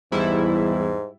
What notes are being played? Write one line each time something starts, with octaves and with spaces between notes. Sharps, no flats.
E2 G#2 G3 E4